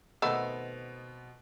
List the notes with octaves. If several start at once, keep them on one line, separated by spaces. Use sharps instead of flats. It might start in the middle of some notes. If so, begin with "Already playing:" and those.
B2 D#3 A3 B3 C4 F#5 B5 E6